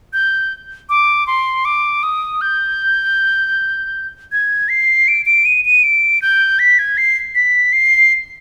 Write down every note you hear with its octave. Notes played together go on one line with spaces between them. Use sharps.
G6
D6
C6
D6
D#6
G6
G#6
C7
D7
D7
D#7
D#7
D7
G6
B6
G#6
C7
B6
C7